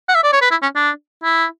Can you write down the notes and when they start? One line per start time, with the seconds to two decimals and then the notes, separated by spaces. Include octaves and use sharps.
0.09 F#5
0.15 E5
0.23 D5
0.33 C#5
0.42 B4
0.51 E4
0.62 C#4
0.75 D4
1.23 E4